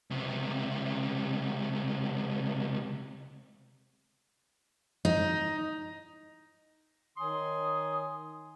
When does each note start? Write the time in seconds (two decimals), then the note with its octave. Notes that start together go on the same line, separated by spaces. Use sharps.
0.11 C#2 C3
5.05 D#4
7.17 D#3 D#4 C#5 G#5 C6 D#6